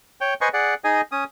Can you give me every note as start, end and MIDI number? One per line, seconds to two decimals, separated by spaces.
0.21 0.34 73
0.21 0.34 79
0.41 0.49 71
0.41 0.49 72
0.41 0.49 75
0.41 0.49 80
0.41 0.49 85
0.53 0.74 68
0.53 0.74 74
0.53 0.74 78
0.84 1.01 63
0.84 1.01 68
0.84 1.01 75
0.84 1.01 80
1.12 1.24 61
1.12 1.24 87